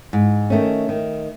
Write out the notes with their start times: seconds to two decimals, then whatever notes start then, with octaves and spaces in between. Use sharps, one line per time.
0.13 G#2
0.50 D#3 A3 C#4
0.89 D#3